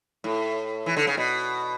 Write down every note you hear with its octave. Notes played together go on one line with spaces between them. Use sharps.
A2
E3
D3
C#3
B2